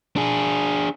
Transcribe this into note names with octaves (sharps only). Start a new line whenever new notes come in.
D4 G#4